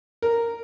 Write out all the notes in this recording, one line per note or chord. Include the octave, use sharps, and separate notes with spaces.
A#4